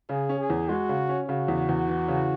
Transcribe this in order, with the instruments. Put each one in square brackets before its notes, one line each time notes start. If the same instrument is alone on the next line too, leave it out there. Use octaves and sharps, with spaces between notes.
[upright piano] C#3 [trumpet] G#4
[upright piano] C#4
[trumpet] G#4
[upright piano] E2
[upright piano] G#3 [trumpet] F#4
[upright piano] C#3
C#4
[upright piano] C#3 [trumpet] F#4
[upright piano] E2
E2
E3
C#3